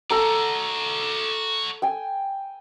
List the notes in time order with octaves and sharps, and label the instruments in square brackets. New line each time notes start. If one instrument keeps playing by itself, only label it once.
[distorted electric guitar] F#4 D5 [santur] A4 A#5
[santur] G5 G#5